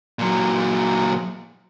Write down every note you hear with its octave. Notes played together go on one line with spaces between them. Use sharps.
A#2 F#3